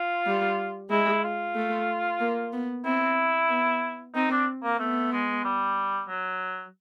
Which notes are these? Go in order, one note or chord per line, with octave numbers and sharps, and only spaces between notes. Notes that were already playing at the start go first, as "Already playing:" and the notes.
Already playing: F4
G3
G#3 E4
F4
A3
A#3
B3
C4 E4
B3
C4 D#4
D4
A#3
A3 B3
G#3
G3
F#3